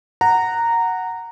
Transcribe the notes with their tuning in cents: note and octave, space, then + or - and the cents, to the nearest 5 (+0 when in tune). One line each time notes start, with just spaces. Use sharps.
F#5 +0 A#5 -10